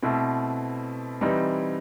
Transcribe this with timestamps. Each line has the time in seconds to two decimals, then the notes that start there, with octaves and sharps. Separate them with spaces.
0.02 B2 A3 C4 E4
1.21 E3 G3 C4 D#4